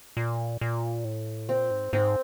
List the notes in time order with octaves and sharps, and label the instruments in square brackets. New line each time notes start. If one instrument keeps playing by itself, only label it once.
[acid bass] A#2
A#2
A2
[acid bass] A#2 [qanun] C4
[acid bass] G#2
[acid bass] G#2 [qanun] C4